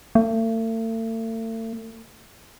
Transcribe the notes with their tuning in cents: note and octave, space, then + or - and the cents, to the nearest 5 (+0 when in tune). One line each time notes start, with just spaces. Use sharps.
A3 +40